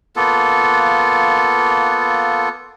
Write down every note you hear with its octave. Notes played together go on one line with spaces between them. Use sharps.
A#3 B3 F4 A4